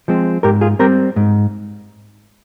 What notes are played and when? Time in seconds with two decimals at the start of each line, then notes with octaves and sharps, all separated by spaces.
0.08 F3 G#3 C4
0.43 G#2 G4 A#4
0.61 F4 G#4
0.79 G3 C4 G4 A#4
1.16 G#2